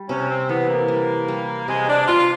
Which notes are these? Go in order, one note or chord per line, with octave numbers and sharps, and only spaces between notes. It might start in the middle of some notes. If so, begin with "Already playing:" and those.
Already playing: G3
C3 C#4
C4
E3 B3
A#3
G3
G3
C3 G#3
D4
C3 F4